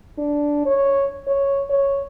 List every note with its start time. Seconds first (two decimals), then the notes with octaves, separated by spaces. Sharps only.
0.18 D4
0.66 C#5
1.27 C#5
1.70 C#5